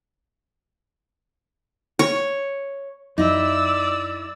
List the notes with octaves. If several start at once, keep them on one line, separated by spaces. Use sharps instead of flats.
C#5
F#2 D#4 E4 D5 E6